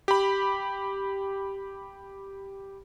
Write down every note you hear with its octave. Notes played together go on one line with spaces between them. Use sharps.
G4 B5